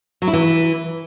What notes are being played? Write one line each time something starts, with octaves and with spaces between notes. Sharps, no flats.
F#3
E4
E3